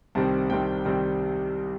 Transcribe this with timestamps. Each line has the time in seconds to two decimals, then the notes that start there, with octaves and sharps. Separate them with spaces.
0.15 C2 C3 D#3 G3 C4 A5
0.50 C2 C3 D#3 G3 C4 G5
0.85 C2 C3 D#3 G3 C4